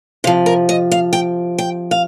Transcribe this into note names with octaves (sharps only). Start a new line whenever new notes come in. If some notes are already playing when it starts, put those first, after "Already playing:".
C3 F3 F5
A#4
D#5
F5
G5
G5
F5